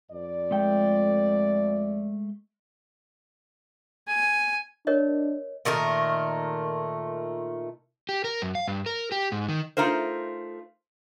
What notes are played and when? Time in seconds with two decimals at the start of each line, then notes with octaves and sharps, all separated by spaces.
0.12 F2 D5
0.51 G#3 A3 G5
4.07 G#5
4.87 D4 A#4 C#5 D#5
5.65 A#2 D#3 A3 A#4
8.09 G4
8.24 A#4
8.42 F#2
8.55 F5
8.68 G2
8.86 A#4
9.12 G4
9.32 G#2
9.49 D#3
9.77 A3 D#4 F4 A#4 C5